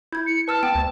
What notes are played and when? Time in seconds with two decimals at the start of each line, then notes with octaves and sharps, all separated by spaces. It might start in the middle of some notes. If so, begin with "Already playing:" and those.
0.12 E4 G6 G#6
0.27 C#7
0.48 B4 A5 E6 F6
0.63 B3 G5
0.75 D2